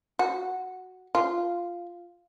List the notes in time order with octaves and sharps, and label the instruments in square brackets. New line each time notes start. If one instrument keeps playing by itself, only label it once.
[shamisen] F#4
F4